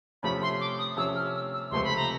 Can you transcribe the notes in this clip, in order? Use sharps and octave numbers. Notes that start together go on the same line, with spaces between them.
C3 F3 A3 C#4 B5
C6
D6
D#6
C3 F3 A3 C#4 E6
F6
E6
E6
C#2 C3 F3 A3 C4 C6
B5
A#5